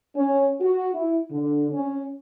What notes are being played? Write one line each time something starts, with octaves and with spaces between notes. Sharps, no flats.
C#4
F#4
E4
D3
C#4